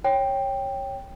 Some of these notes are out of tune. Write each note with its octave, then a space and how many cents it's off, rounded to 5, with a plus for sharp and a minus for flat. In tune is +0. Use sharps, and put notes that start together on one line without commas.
C#5 -10 G5 +5